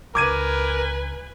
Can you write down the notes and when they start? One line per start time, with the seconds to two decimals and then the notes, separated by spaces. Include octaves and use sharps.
0.15 C#2 A#4 B4 G#5 D6 G#6 D#7